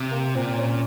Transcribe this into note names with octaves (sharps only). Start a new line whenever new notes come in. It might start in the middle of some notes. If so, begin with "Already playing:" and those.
Already playing: C3
A#3
A#2 C4
C#4